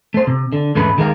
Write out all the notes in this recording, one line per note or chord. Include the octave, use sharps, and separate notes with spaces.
A3 C5
C3
D3
E2 G#2 C#3 A3 B4 B5
C#2 D#3 G#3 A#3 A#4 F5